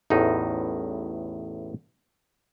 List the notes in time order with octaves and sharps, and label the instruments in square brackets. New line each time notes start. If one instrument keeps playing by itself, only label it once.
[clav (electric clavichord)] A1 E2 A2 D#4